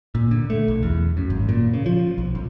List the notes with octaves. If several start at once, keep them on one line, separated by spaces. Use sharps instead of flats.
A#2
D3
A3
B1
E2
F#2
G#1
A#2
C#3
F3
B1
B1